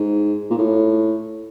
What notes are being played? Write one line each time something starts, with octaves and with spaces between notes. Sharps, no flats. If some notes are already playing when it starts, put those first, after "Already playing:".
Already playing: G#2
A#2
A2